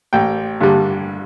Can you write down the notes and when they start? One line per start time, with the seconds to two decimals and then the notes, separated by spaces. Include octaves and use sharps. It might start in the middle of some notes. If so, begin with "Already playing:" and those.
0.13 A1 G5
0.61 G2 D3 G3